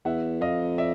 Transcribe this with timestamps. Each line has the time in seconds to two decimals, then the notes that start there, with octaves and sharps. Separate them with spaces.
0.05 E2 E5 F#5
0.41 F2 D#5 F5
0.78 D5 E5